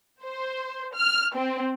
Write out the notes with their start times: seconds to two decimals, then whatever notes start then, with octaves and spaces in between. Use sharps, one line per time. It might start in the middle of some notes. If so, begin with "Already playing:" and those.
0.23 C5
0.95 F6
1.36 C4